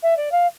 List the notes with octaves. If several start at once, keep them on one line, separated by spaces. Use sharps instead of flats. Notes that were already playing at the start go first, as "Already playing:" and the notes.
E5
D5
F5